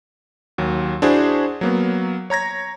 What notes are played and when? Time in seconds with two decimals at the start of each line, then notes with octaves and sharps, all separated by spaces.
0.58 D#2 F#3
1.02 D4 E4 F#4 G#4 C5
1.61 F#3 A#3 B3
2.30 C#5 A#5 G#6 A#6